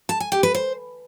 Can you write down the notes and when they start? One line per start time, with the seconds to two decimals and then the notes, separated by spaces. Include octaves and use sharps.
0.09 A5
0.20 G#5
0.32 G4
0.43 B4
0.55 C5